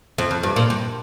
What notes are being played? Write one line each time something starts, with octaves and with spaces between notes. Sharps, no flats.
F2
F2
G2
A#2
G2